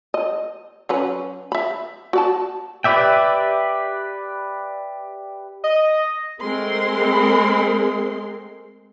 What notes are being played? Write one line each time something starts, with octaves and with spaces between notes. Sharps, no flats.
D#5
F#3 C#4 B4
E5 B5
F#4 D5 A5
G4 B4 D5 E5 G5
D#5
G#3 A3 C4 G#4 A#4 C6